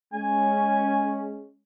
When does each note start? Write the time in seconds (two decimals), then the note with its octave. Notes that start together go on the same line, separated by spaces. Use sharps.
0.13 G#3 C#4 G#5